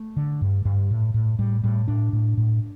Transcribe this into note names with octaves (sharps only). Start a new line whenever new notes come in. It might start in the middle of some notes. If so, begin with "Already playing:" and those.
Already playing: A3
D3
G2
G2
A2
A2
A2 G3
A2 G3
A2 D4
A2
A2